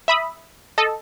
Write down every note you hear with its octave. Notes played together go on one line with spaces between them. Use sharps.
E5 B5 D#6
A4 D#5